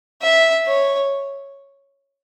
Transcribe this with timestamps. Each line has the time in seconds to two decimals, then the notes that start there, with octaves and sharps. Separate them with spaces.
0.22 E5
0.66 C#5